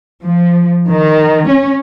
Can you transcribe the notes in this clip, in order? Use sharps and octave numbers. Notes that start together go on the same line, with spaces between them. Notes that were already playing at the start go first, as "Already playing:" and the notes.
F3
D#3
C#4